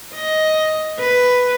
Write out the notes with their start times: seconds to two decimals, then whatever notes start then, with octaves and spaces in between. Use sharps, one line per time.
0.14 D#5
1.00 B4